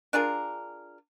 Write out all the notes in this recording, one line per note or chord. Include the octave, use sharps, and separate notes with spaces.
D4 F4 G#4 A#4